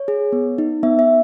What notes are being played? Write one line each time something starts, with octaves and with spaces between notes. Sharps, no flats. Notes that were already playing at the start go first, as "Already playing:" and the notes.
Already playing: C#5
G#4
B3
D#4
B3 E5
E5